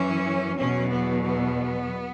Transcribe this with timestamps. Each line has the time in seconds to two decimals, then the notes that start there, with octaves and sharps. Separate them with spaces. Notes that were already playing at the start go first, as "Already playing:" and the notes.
Already playing: F#2 E3 C#4
0.57 E2 B2 F#3 C#4
0.90 B3
1.24 B3